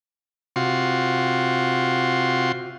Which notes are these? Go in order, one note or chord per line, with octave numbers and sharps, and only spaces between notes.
C3 F4 F#4 C6